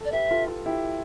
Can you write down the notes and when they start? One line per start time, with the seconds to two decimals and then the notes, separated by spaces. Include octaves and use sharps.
0.01 A4 D5
0.12 G4 B4 E5
0.31 F4 A4
0.48 F4 A4
0.66 E4 G4